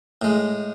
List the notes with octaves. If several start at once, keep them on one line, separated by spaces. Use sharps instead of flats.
A2 G#3